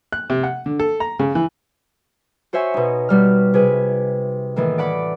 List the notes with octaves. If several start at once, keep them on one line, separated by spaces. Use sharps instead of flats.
F#6
C3
F#5
D3
A4
A#5
C#3
E3
F#4 C5 C#5 E5 G#5
B2 D#4
B2 G3 F6
C3 G#4 B4
A2 D#3 E3 A#3
D5 F#5 B5 D6